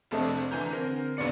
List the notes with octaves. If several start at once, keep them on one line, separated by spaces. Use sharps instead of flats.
F1 C3 A3 D4 A4 D#5
D3 E3 G#5 A#5 G6
D3 C4 A#4
F1 B1 G2 B3 D5 C#7